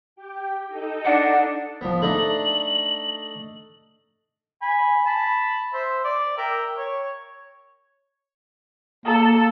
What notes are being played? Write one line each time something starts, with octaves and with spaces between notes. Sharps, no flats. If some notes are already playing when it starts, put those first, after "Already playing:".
G4 G5
D#4 A4 D#5
D4 F#5
F3 B3
A3 D4 D#4 F#7
G#5 B5
A5 B5
C5 E5
D5
A#4 E5 G5
C#5
A#3 A4